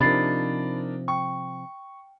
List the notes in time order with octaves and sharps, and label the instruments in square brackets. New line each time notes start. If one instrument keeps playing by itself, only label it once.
[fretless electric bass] C3 F3 [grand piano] D4 D#4 A#4 [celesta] B5 A6 C7
[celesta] G5 [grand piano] C#6